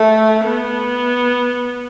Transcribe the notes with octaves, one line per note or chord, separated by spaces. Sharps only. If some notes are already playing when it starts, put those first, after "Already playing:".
Already playing: A3
B3